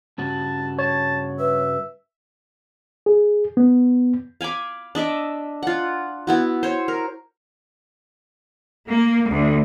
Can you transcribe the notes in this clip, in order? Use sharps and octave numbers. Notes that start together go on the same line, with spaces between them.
G2 C#3 F#4 A5
C#5 A5
B4 E5
G#4
B3
F5 G#5 B5 D6
D4 D#5 E5 D6
F4 F#5
B3 E4 F#4
C5 C#5
A#4
A#3
D2